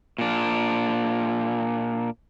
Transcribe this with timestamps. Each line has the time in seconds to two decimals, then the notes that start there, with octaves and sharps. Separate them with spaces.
0.18 A#2 D4